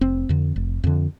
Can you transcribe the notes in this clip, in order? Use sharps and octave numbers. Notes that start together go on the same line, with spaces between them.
F1 C4
F2 D3
F1
F2 D3